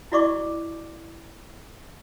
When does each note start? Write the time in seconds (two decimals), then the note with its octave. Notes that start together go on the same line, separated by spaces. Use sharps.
0.12 E4 F#4 D5 D#5 C#6 D6